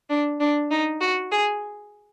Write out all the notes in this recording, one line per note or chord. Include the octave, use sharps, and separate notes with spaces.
D4
D4
D#4
F#4
G#4